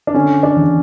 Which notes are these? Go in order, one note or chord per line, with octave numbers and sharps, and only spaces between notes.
D4
D3 C#4
D4
E2